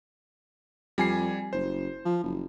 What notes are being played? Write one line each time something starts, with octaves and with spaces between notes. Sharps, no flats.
F2 G3 G#5 C7
F#1 C5
F3
F#1